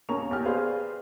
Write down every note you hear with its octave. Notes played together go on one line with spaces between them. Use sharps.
D#2 A#3 C#4 A#5 C#6 F7
E2 G4 F6
G4 G#4 B4 C5 D5 F5